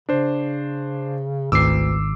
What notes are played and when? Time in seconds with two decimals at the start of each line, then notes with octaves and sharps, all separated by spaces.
0.09 C#3 D4 C5
1.52 G#1 D2 D6 E6 C7